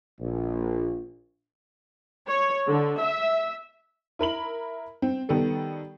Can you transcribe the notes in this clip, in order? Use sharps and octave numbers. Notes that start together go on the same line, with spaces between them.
A#1
C#5
D3
E5
E4 A#4 B5 F#7
C4
D#3 G3 B3 A4